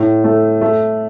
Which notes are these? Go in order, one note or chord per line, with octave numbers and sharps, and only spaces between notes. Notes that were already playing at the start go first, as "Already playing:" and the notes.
Already playing: A2
A3
A3